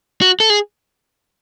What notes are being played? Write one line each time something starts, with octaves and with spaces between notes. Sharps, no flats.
F#4
A4
G#4